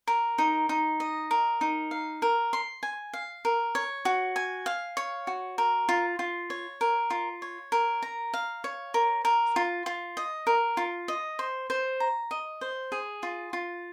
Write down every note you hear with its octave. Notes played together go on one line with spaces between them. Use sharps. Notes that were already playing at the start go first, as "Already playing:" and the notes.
A#4
D#4
D#4
D#5
A#4
D#4
F5
A#4
C6
G#5
F5
A#4
C#5
F#4
G#5
F5
C#5
F#4
A#4
F4
F4
C#5
A#4
F4
C#5
A#4
A#5
F5
C#5
A#4
A#4
F4
F4
D#5
A#4
F4
D#5
C5
C5
A#5
D#5
C5
G#4
F4
F4